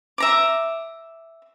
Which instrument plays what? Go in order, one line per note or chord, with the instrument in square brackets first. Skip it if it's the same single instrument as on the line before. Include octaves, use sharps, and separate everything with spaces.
[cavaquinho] E5 A#5 D6